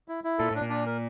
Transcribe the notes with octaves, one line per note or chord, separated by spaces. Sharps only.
E4
E4
A#2 A4
A2 D4
A#2
D4
A#4